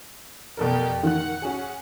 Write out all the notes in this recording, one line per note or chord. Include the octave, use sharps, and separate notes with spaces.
F2 B2 G4 A4 A#4 D5
D#3 F#5 F#6
C#4 F#4 G#4